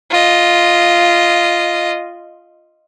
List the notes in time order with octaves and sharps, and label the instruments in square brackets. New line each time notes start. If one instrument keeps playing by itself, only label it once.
[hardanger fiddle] F4 D#5